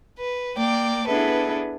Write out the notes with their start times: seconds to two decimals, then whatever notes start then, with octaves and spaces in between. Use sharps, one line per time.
0.17 B4
0.56 A#3 D5 G5
1.06 B3 D4 E4 G#4 A4 B4